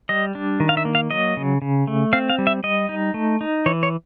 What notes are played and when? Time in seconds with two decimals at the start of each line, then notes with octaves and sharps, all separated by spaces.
0.09 G3 D#5
0.35 D4
0.60 D#3
0.69 F5
0.77 E5
0.85 A#3
0.95 F5
1.11 F#3 D#5
1.37 C#3
1.62 C#3
1.87 A3
2.13 C4 F5
2.30 F5
2.39 G3
2.47 E5
2.64 G3 D#5
2.89 D#4
3.14 A3
3.41 D#4
3.66 E3 C#5
3.83 C#5